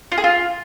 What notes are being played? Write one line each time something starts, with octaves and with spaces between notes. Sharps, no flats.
F4
G#4
F4